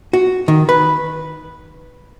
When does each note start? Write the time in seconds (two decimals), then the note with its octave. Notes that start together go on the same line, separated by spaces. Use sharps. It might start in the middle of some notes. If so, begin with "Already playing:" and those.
0.13 F#4
0.48 D#3
0.69 B4